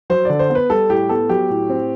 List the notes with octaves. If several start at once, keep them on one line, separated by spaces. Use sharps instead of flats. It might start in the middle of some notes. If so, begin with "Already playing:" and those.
F#3 C5
D3 D5
C5
B3
B4
G3 A4
A2 G4
B3 A4
F#3 G4
A2
C4